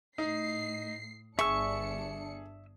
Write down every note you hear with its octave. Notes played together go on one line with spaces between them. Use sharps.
A2 D#4 C7
G1 D4 G#4 E5 C#6 E6 C#7